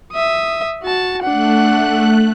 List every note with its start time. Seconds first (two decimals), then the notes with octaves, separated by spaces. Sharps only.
0.13 E5 D#6
0.83 F#4 A5
1.22 A3 D4 F#5 F#6